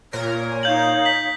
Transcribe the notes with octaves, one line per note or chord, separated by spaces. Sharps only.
A#2 A#4 C#5
G#5
D#4 F5 G6 F#7
B6 F#7